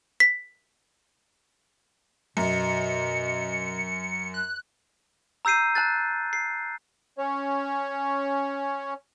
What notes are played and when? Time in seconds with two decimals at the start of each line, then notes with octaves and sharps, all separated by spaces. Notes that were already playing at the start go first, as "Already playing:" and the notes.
0.20 B6
2.37 F#2 B2 C#7
4.34 F#6
5.45 A#5 E6 G6 C7 D#7
5.75 A5 F#6 A6
6.33 C7
7.18 C#4 C#5